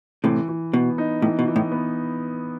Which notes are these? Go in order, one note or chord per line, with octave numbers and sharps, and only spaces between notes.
A2 C3 E3
E3
B2 B3
D#4
A2 E3
B2
E3
A2
B3